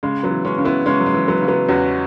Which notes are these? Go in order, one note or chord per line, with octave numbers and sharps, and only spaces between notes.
C#3 G#3
F#3 B3
E3
G#3 C#4
C#3
B3 E4
C#3 G#3 C#4
F#3
G#3
E3
F#3 B3
C#3
F#3 B3
E2 C#4 F#4